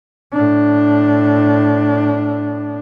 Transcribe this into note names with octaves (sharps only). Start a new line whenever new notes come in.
A2 D4